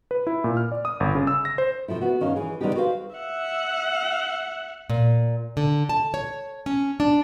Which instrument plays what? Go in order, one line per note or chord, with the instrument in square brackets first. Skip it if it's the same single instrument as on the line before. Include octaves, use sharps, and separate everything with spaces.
[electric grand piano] B4
E4
A#2
F6
D5
D#6
G1
C#3
E6
A#6
C5
[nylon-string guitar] C3 F3 A3 E4
B3 F#4
G2 D#3 C#4 D#4 F5
E3 G#4
D3 D#3 G3 B3 D#4 G4
F#4 G#4 B4 C5 E5 F5
[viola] E5 F#5
[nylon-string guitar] A#2
D3
A5
C#5
C#4
D4